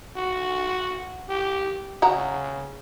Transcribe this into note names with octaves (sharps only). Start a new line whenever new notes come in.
F#4
G4
C#3 F#4 F#5 A#5